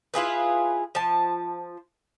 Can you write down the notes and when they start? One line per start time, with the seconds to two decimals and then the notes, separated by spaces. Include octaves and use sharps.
0.14 E4 F4 G#4 B4
0.95 F3 A5